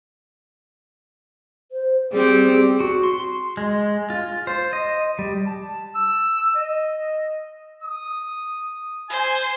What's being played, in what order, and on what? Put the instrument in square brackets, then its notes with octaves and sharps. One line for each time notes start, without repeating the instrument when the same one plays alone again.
[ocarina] C5
[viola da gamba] G3 C4 G4 [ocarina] G#4
[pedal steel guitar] F#4
C6
G#3
F4
C5
D#5
G3
[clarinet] A5
E6
D#5
[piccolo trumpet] D#6
[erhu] C5 [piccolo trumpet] G#5